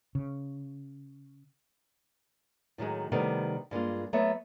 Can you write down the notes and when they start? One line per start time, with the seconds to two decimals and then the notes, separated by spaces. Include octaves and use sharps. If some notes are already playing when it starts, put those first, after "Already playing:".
0.15 C#3
2.78 A2 D#3 F#3 G#3
3.12 C3 D#3 G3 A3 B3
3.71 G2 G#3 A#3 F4
4.13 F#3 A3 B3 C#5 E5